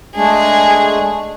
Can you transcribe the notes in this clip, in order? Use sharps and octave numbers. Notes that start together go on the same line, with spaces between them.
G#3 A3 D4 G#4